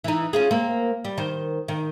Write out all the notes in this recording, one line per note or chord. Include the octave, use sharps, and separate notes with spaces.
E3 D#4
C#4 F4 G#4
A#3 C4
G3
D#3 C5
D#3